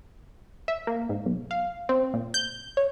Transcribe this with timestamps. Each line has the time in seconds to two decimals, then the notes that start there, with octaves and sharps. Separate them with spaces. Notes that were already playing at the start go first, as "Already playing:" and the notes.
0.68 E5
0.87 A#3
1.09 G#2
1.26 B1
1.51 F5
1.89 C4
2.13 A#2
2.34 G6
2.77 C#5